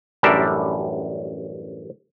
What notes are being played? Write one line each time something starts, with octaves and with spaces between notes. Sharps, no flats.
A1 F#2 G3 D4 A#4 E5